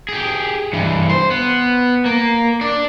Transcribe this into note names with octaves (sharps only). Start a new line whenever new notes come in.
G4 G#4
G2 E3
C5
B3
A#3
D4 D5